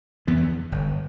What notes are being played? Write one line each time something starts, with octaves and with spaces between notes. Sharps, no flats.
F2 E3 B3
G1